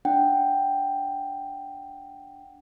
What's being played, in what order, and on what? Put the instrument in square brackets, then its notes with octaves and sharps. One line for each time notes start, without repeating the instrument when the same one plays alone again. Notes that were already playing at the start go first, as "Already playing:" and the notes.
[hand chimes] D4 F#5 G5